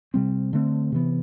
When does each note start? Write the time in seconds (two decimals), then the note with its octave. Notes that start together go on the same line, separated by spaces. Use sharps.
0.14 C3 G3 C4
0.53 D3 A3 C4
0.92 C3 E3 B3